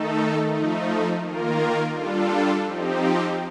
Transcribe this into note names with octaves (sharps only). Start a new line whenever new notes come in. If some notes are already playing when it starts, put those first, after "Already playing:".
Already playing: D#3 A3 D#4 A4
F3 A3 D#4
D#3 A#3 F4 A#4
G3 D4 F4 A4
F3 C4 D#4 G4